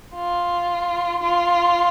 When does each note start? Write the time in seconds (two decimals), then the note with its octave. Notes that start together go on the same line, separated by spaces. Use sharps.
0.15 F4
1.23 F4